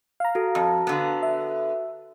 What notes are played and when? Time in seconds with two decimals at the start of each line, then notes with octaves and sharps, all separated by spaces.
0.20 F5 A#5
0.35 F#4 A4
0.55 F2
0.87 D3 B3
1.23 E5